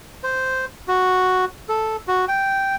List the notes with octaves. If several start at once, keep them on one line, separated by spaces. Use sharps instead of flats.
C5
F#4
A4
F#4
G5